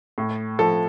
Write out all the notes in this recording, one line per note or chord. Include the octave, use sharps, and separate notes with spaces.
A2
F3 A4